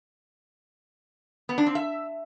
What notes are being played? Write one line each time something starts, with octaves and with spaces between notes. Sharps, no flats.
B3
D4
C4
E5